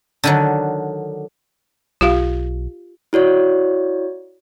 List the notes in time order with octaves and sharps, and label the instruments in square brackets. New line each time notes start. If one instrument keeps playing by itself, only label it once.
[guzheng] D3 D#3 F#3
[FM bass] B1 [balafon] F4 G4 F5
[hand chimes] E4 F#4 C#5 D5